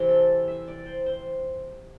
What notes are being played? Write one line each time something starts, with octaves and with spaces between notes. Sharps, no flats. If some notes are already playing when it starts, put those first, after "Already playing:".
Already playing: C3 E3 C4
A4
E5
D5
C5
C5